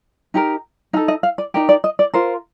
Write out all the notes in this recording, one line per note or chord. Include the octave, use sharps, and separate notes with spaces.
D#4 G4 A#4
D#4 A4 F5
D#5
F5
D5
D#4 G4 A#4 D5
D5
D#5
D5
F4 A#4 C5